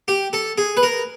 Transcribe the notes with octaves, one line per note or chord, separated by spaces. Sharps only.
G4
A4
G#4
B4
A#4